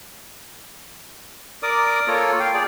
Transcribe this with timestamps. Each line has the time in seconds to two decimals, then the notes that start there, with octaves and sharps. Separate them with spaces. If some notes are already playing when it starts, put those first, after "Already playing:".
1.63 A#4 D5 D6 D#6
2.08 A#3 F4 A4 C#5
2.40 F4 F5 G5
2.54 G#4 D5